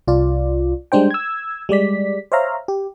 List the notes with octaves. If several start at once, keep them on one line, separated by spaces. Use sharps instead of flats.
C2 F4 D5
G3 G#3 D4 C5 G5
E6 G#6
G3 G#3 D5 B6
C5 C#5 E5 F5 A#5
G4